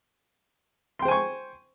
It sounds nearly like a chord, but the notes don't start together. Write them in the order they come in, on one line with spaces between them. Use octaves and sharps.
C6 G5 C5 G#5 C#6